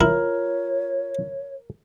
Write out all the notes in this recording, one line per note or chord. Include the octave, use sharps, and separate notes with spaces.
E4 F4 A#4 C#5